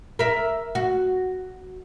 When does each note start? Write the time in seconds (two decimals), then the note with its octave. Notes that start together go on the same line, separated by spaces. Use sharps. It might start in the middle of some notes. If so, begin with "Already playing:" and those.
0.19 A#4 E5
0.75 F#4